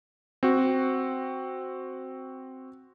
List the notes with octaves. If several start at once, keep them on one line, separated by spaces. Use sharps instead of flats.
C4 F#4